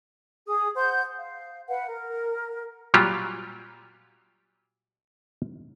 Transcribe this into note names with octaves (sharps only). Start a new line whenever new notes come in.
G#4 D#6
C5 F#5 C6 G6
F5
B4 F5 F#5
A#4
A#2 F#3 G3 F4 G4